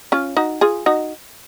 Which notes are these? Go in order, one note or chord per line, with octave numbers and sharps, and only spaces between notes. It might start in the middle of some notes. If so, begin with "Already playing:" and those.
C#4 F4
D#4 F#4
F4 G#4
D#4 F#4